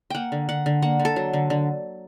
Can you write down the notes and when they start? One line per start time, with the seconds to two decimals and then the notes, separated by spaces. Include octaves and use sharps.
0.10 A#3 F#5 G5
0.32 D3
0.49 D3 F#5
0.66 D3
0.82 A#3 F#5
0.99 D3
1.05 A4
1.16 F#3
1.33 D3
1.50 D3